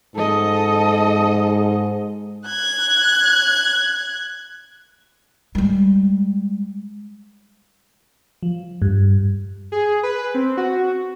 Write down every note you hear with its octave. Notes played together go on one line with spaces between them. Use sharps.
G#2 A4 D#5
F#6 G#6
G3 G#3
F3
G2
G#4
B4
C4
F#4